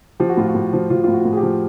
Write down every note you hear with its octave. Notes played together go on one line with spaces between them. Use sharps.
F3 G4
F#4
A2 F4
F#4
A2
F3
F3 F4
A2 F4
F#4
A2
G#4
G4
F3